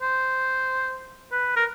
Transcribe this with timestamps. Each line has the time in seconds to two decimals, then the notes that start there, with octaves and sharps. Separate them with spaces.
0.01 C5
1.31 B4
1.56 A#4